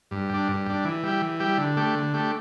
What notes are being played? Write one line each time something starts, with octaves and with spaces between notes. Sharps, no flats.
G2
G3 D4
G2
G3 D4
E3
G3 E4 G4
E3
G3 E4 G4
D3
A3 D4 G4
D3
A3 D4 G4